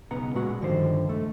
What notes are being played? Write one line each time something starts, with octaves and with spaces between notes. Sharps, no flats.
B1 C#3 B3 F#5 A#5
A#2 G#3 F#4 F#5
G2 D3 D#3 F3 C5
C#2 A3